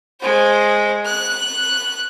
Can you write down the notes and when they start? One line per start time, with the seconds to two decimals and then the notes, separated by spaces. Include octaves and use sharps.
0.20 G#3 C5
1.05 F#6